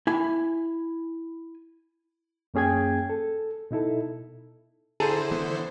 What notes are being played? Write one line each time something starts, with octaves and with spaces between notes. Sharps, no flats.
E4 G#5
F#2 A#3 C#4 G#4 G5 G#6
A4
B2 D#4 E4 A4
D3 E4 G#4 A4 C5 A5 A#5
E3 B3